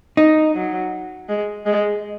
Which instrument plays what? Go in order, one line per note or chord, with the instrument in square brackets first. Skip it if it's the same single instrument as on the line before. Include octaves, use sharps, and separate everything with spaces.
[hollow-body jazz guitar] D#4
[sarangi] F#3
G#3
G#3